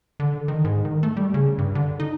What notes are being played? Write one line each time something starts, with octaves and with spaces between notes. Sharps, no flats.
D3
D#3
G#2
D#3
A3
G3
C#3
G2
D3
D#4